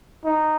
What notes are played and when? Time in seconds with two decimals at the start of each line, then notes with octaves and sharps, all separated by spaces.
0.25 D#4